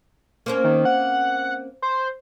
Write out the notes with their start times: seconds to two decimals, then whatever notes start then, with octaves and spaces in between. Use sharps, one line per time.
0.46 A#3 C4 C#4
0.64 D#3
0.85 F#5
1.82 C5